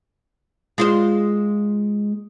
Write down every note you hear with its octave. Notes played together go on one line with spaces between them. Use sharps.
G#3 F4 C5